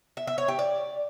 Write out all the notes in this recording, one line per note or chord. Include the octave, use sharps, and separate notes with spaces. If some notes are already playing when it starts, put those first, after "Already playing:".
E5
E5
C#5
G4
D5